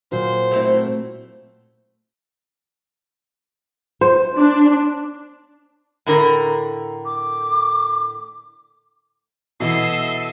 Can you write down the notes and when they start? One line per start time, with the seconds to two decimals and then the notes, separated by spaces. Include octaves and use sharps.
0.12 A#2 F#3 C5
0.51 A3 C4 E4
4.01 C5
4.36 D4
6.06 A2 D3 A#4
7.05 D6
9.60 B2 E3 A4 D#5 E5 C7